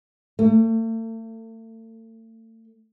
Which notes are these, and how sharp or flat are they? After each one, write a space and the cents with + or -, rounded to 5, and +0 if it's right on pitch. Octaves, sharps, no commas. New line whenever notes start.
A3 +40